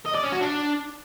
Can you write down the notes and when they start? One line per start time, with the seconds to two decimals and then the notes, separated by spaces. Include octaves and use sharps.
0.06 D#5
0.15 D5
0.23 C#4
0.32 F#4
0.41 D4